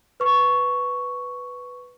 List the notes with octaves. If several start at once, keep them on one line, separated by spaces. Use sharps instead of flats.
B4 C#6